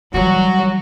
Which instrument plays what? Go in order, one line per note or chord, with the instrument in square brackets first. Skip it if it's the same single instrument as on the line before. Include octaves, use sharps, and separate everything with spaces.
[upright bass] E3 G3 [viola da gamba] F#3 [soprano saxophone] F#4